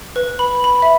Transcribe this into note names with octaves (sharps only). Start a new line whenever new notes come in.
B4
B5
B5
E5